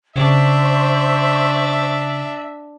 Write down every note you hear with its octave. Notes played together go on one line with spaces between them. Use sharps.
C#3 D4 C5 E5 C#6